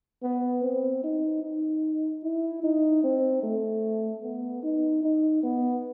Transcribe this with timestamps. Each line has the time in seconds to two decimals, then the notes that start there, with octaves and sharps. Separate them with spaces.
0.23 B3
0.63 C4
1.03 D#4
1.43 D#4
2.23 E4
2.63 D#4
3.03 C4
3.43 A3
4.23 B3
4.63 D#4
5.03 D#4
5.43 B3